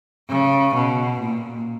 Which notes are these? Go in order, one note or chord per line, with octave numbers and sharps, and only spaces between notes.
C#3
B2
A#2